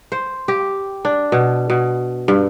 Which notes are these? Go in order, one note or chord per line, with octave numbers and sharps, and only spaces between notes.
C5
G4
D4
B2
B2
G2